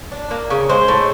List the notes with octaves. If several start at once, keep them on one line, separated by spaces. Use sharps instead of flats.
D4
A#3
C#3
G#3 C5
A2